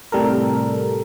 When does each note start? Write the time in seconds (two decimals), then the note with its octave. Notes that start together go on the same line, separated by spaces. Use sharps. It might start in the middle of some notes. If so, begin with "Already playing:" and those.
0.12 A2 C3 G3 A4 A#4